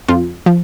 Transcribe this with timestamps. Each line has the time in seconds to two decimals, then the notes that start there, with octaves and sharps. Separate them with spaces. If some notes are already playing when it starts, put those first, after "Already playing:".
0.08 F2 F4
0.46 F3